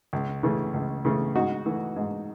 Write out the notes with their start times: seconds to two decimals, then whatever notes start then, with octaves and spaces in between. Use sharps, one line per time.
0.13 C#2
0.43 C#3 E3 A3
0.74 C#2
1.05 C#3 E3 A3
1.35 G#2 D#4 F#4
1.66 E3 A3
1.96 G#2